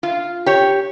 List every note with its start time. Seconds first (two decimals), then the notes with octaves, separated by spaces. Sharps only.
0.03 F4
0.46 G4 C#5